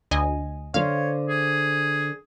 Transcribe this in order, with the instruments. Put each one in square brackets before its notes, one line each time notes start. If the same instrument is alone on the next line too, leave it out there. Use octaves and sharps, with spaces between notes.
[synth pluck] D2 D#5 G#5
[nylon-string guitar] D3 C5 [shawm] C#5 [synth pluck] F5
[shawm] G#4